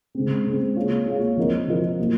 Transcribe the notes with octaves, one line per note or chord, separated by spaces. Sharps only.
C#3 G#3 C4
C#3 G#3 C4
A#3 F4 G#4 C#5 F5
A#3 F4 G#4 C#5 F5
F3 C4 F4 A#4 D#5
F3 C4 F4 A#4 D#5
A#2 F#3 A#3 F4